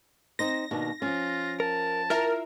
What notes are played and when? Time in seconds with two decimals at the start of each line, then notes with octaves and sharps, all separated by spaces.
0.39 C4 D#4 C5 A#6
0.71 D#2 B2 D4
1.02 F3 C#4 F4
1.60 A#4 A5
2.10 E4 F4 A#4 E5